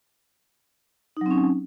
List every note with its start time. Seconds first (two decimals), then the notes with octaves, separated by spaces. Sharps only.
1.17 D#4
1.21 F#3
1.26 C4
1.31 C#4